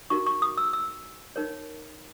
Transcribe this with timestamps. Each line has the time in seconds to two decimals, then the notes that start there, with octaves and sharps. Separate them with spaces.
0.10 D#4 F#4 A#4 C#6
0.26 C#6
0.42 D#6
0.57 E6
0.73 E6
1.36 D#4 A#4 C#5